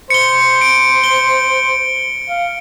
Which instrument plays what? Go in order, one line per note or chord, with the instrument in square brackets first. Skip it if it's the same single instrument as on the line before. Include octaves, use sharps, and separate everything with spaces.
[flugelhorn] C5 [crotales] C#7 G7
[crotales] D7
G7
[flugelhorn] F5